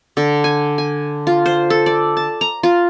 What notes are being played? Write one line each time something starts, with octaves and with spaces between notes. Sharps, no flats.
D3
G#5
G#5
F4
C5
A4
D5
A5
A#5
F4